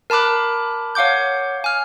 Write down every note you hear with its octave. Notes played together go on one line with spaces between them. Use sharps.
A#4 A5 B5 D6 F#6
C#5 F5 F#5 D6 G6
G#5 F6